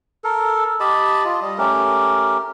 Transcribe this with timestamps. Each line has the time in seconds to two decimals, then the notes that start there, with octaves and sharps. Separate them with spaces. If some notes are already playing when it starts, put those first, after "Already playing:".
0.24 A4 A#4
0.80 G4 D#5 A5 B5
1.25 F4 D#5
1.41 G3 D#5
1.58 A3 C#4 G4 A#4